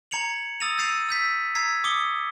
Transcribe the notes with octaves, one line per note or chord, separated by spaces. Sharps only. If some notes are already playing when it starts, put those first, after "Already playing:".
A#5 G#6 C#7 F7 F#7
D#6 E6 A6 A#6 D#7 F7
E6 G6 A6 C7 D#7 F7
E6 G6 B6
A#5 E6 G#6 B6 C7
D6 D#6 C#7 G7